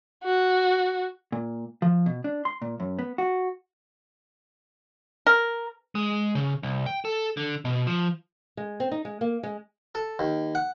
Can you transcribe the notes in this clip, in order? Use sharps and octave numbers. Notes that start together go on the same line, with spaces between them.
F#4
A#2
F3
B2
D4
C6
A#2
F#2
B3
F#4
A#4
G#3
C#3
C2
G5
A4
D3
B2
F3
G#3
C4
D#4
G#3
A#3
G#3
A4
D#2
F#5